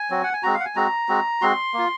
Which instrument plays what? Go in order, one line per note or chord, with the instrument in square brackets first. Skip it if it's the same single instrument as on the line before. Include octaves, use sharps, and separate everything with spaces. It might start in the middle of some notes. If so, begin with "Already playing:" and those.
Already playing: [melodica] G#5
F#3 C4 F#4
F#5
G#5
G#3 C4 F#4 A#5
F5
F#5
G#5
G#3 C4 F#4 A#5
G#3 C4 F#4
G#3 C4 F#4 C6
A#3 F4